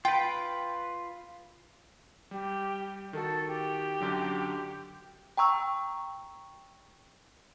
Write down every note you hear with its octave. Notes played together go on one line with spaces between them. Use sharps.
F4 B4 G5
G3 G4
D#3 F#4 A4
G4
F#2 D3 F#3
G5 A#5 C#6 E6